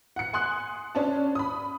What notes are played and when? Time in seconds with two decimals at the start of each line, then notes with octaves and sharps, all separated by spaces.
0.16 F#5 C#7
0.33 G#5 C6 D#6 F#6
0.95 C#4 D4 A5
1.35 B5 D#6